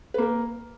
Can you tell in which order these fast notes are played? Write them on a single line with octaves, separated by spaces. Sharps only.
B4 A#3 A#4